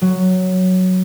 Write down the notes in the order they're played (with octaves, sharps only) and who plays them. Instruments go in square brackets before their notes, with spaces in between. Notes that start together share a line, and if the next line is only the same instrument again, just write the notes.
[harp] F#3